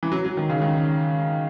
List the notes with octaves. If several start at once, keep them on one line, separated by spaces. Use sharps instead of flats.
E3
F#3
F#3
D#3
C#3
D#3